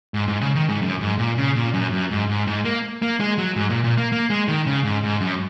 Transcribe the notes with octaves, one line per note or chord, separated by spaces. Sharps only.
G#2
G#2
C#3
D#3
G#2
F#2
G#2
A#2
C#3
A#2
F#2
F#2
G#2
G#2
G#2
A#3
A#3
G#3
F#3
G#2
A#2
A#2
A#3
A#3
G#3
D#3
C#3
G#2
G#2
F#2